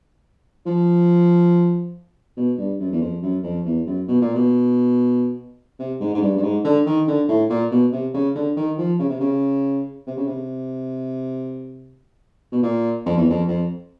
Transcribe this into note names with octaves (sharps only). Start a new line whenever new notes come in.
F3
B2
G2
F#2
E2
F2
F#2
F2
E2
F#2
B2
A#2
B2
C3
G#2
G#2
G2
G2
G#2
D3
D#3
D3
A2
A#2
B2
C3
C#3
D3
D#3
F3
C#3
C3
C#3
C3
C#3
C3
B2
A#2
F2
E2
F2
F2